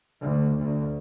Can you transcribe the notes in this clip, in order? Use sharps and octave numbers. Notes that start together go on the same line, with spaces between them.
D2
D2